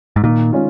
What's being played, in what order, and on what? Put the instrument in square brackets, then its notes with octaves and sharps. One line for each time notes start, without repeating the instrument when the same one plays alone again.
[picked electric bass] G#2
[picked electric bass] A#2 [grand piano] D#3
[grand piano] G#3 C#4 F4